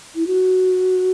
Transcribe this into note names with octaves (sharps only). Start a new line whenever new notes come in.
E4
F#4